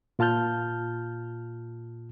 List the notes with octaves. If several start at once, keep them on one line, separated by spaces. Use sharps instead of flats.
A#2 F4 A5 F6 G6